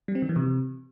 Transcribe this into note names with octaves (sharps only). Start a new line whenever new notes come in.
G3
C4
D#3
E3
C3